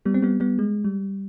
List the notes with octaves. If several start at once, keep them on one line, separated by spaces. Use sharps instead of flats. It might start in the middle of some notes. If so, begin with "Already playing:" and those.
G3 B3
C4
G3 B3
G3 B3
G#3
G3